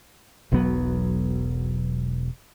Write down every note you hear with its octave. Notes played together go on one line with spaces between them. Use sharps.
E1 B1 F#3 B3